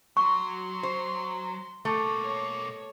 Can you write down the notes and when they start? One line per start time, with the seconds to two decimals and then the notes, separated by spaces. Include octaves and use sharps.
0.17 F#3 C6 C#6
0.83 C5
1.85 B2 A3 A#3
2.22 C#5